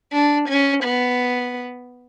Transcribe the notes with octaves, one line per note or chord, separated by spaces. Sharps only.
D4
C#4
B3